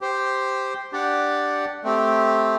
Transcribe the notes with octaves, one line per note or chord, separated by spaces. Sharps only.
G4 C5 G5
D4 G4 D5 F#5
A3 C4 G4